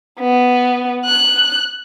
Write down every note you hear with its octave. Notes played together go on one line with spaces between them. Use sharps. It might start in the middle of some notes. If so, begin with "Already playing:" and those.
B3
F#6